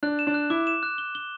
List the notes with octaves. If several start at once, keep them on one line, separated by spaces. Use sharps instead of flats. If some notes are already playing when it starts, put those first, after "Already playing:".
D4 F#6
E7
D4
F#6
E4 D6
E7
F#6
G7
G7